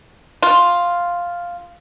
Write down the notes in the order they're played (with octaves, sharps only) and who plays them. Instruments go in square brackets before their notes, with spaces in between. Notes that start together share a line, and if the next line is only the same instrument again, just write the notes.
[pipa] F4